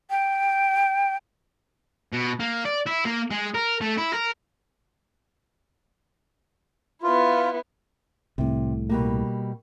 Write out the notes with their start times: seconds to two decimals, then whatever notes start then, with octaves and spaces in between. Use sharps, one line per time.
0.10 G5
2.13 B2
2.40 A#3
2.65 D5
2.86 E4
3.05 A#3
3.31 G#3
3.55 A#4
3.81 A3
3.98 E4
4.14 A#4
7.03 B3 E4 F4
8.38 C2 A2 C3
8.89 B2 G3 A#3